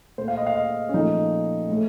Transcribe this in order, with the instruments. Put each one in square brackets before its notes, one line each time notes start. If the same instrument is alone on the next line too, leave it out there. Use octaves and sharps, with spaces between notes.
[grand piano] A#2 A3 C5
F5
D#5
F5
D#5
C#4
A#2 F3 A3 D#4
A2 A3